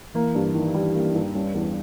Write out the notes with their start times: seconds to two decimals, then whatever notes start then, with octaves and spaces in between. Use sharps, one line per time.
0.14 E3 A#3
0.35 G2
0.55 D#3
0.74 G3
0.94 A#3
1.15 G2
1.34 G3 C#4
1.54 E2